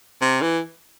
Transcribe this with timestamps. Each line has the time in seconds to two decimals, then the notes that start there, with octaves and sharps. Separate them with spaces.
0.22 C3
0.41 E3